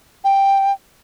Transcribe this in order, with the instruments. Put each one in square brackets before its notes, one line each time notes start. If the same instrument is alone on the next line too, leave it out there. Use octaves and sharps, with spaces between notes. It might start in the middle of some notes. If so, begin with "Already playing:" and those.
[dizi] G5